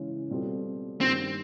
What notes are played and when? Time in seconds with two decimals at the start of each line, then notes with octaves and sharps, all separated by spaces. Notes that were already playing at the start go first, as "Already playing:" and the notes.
Already playing: C#3 E3 G#3 C#4
0.30 B2 G3 C4 F4 A4
1.01 G2 D#3 G3 A#3 C4 C#4